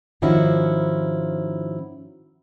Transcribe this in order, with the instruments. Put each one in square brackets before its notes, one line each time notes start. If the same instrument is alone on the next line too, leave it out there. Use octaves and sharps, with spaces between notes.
[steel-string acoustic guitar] G#2 D#3 F3 C#4 E4 F#4